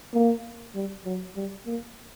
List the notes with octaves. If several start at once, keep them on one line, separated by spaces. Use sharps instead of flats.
A#3
G3
F#3
G3
A#3